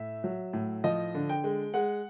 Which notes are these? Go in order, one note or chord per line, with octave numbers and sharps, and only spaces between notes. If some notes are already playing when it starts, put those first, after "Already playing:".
Already playing: A2 E5
F#3
A2
F3 D#5
D3
G5
G#3
G#3 F#5